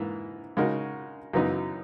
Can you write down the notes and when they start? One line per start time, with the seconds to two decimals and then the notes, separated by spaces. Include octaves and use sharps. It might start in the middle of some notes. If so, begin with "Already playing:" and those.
Already playing: G#2 E3 A#3 E4
0.57 C#3 G#3 D#4 F#4 A#4
1.33 F#2 C#3 E3 B3 D#4